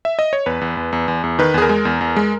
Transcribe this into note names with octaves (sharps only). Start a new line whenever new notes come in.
E5
D#5
C#5
E2 B4
E2
E2
E2
E2
E2
D#3 B4
E2 G#4
A#4
G#3
E2
E2
G#3